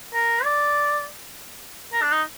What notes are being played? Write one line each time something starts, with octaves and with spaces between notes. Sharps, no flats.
A#4
D5
A#4
D4
D#4